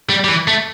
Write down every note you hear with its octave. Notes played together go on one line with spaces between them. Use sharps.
G3
G3
E3
A3